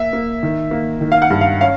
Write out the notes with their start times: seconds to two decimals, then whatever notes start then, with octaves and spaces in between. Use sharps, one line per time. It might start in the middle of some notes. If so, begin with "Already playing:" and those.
Already playing: A#3 E5
0.13 A#3
0.43 D#3
0.71 A#3
1.01 D#3
1.12 F5
1.22 F#5
1.30 G2
1.41 F5
1.61 C#4 F5